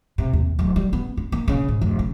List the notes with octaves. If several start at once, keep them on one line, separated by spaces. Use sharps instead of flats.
C3
D#2
D1
G3
B3
D4
A#3
C#3
G#2
F1
C#3